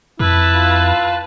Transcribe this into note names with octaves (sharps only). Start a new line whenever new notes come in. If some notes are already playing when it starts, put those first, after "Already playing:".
F2 E4 B4 A5
F4